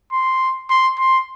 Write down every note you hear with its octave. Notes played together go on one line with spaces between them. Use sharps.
C6
C6
C6